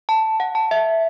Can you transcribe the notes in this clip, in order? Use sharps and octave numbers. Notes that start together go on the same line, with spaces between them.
A5
F#5
A5
E5